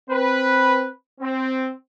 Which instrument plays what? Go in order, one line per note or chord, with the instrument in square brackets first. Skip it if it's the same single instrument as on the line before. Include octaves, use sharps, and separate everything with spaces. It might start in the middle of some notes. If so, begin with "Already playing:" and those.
[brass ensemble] C4 B4
C4